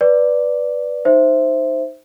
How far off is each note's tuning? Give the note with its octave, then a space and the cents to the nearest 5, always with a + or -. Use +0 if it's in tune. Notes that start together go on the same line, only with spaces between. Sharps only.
B4 +0 D5 +0
D#4 +0 C5 +0 E5 +0